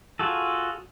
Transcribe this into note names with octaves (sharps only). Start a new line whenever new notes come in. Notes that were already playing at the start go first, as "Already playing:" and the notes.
F4 F#4 G#4 A4